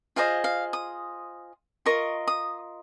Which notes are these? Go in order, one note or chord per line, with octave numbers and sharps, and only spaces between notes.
F4 G#4 C5 D#5 F5
F5
D#6
F4 A#4 D#5 C#6
D#6